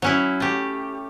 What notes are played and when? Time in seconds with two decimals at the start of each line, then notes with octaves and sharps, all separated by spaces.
0.02 F#3 C#4 E4
0.40 A3 G4